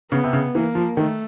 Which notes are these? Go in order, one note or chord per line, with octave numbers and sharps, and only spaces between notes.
C#3 B3
C3
C#3
E3 A#3
F3
D#3 A3